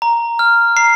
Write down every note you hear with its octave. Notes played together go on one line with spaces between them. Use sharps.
A#5
F6
A#5 C7